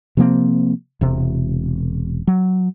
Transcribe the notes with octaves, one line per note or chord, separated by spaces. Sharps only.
C3 F3 A#3 C4
E1 C3
F#3